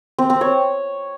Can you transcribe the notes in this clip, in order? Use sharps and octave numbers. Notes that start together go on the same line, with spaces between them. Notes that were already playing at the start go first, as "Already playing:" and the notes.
C4
C4
C#5